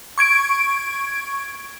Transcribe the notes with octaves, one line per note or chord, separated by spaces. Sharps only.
C#6 G#6 D7